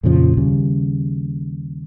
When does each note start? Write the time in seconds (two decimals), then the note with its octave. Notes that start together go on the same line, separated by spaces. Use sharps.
0.03 F2 A#2 C#3 F3
0.37 D#2 C#3 G3